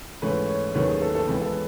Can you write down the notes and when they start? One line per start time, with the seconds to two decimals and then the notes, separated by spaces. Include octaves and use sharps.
0.22 G#2 E3 A3 C#4 B4
0.48 C#5
0.74 D#2 D#3 F#3 A3 C#4 B4
0.88 G#4
1.02 A4
1.15 A4
1.27 C#2 C#3 E3 G#3 B3 B4
1.42 A4